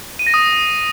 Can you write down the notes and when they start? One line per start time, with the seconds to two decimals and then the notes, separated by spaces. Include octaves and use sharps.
0.19 D#7
0.27 A#6
0.34 D#6